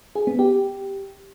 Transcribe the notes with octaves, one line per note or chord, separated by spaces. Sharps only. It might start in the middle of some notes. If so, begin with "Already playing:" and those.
G#4
B3
G4